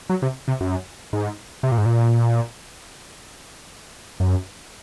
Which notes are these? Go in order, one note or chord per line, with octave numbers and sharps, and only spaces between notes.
F#3
C3
C3
F#2
G#2
C3
A#2
G#2
A#2
F#2